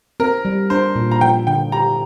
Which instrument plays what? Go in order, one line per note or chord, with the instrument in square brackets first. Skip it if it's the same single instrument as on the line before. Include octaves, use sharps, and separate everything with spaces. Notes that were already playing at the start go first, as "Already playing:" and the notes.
[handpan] C4 [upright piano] A#4
[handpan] G3
[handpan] D4 [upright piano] C5
[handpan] A#2
[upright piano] A#5
[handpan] F3 [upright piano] G5
[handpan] D3 [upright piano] G5
[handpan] G4 [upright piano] A#5